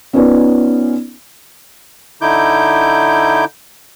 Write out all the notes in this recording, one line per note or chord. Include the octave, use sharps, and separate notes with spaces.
B3 C#4 D#4 F4 B4 D5
D3 D#4 E4 D6 G6